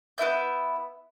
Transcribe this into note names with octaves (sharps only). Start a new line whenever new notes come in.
B3 E4 E5 G6